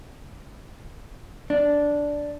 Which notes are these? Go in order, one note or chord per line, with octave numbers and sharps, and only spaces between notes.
D4